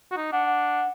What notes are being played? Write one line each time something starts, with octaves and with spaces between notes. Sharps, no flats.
F#4
D#4
D4 F#5
F#5